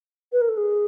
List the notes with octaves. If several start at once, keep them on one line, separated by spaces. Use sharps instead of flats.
B4
A#4
A4
G#4